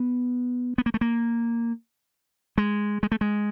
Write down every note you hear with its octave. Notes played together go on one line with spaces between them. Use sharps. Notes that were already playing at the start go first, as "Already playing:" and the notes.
Already playing: B3
B3
A#3
A3
A#3
G#3
G#3
A3
G#3